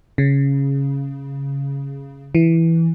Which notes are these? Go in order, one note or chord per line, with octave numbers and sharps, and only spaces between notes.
C#3
E3